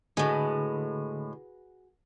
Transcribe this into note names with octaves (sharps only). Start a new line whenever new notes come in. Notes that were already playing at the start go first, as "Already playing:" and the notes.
A2 D3 G#3 F#4 G#4 B4